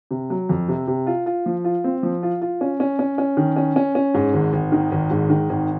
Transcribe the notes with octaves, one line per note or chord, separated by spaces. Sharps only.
C3
F#3
F2
C3
C3
F4
F4
F3
F4
C4
F3
F4
F4
C#4
C#4
C#4
C#4
D#3
C#4
C#4
C#4
G#2
G#1
G#1
D#3
G#1
G#2
D#3
G#1